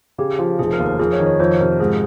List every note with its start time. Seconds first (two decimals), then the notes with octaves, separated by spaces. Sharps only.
0.18 C#3 G4
0.39 F3
0.59 F1 G#4
0.73 A#4
0.79 D#2
0.86 A#4
0.99 F2 G#4
1.13 C#5
1.19 D#3
1.26 C#5
1.39 F2 C5
1.60 C3 A#4
1.80 G#2 G#4